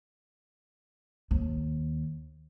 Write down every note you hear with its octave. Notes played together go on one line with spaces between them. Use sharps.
D#2